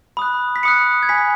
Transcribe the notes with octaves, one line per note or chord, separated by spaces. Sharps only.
B5 D#6 F#6
B6
B5 D#6 F#6 C#7
G#6
G#5 B5 F#6 B6